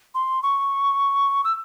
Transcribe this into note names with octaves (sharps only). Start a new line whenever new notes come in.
C6
C#6
E6